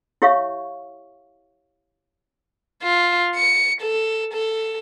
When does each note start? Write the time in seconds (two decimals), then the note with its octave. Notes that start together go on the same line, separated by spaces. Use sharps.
0.22 E4 G4 C#5 E5 F5 C#6
2.83 F4
3.36 C#7
3.81 A4
4.33 A4